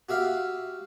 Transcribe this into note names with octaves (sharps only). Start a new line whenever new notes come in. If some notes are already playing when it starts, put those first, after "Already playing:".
F#4 G4 E5 F5